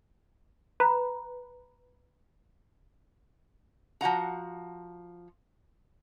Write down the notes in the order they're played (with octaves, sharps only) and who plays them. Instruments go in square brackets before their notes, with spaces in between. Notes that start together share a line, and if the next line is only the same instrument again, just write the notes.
[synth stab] B4 [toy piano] A#5
[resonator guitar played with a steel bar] F3 F#4 F#5 A#5